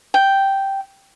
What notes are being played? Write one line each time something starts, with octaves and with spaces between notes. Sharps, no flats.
G5